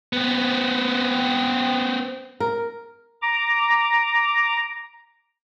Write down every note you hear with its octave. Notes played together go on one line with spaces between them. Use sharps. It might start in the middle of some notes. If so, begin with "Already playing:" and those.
B3 C4
A#4
A#5 D6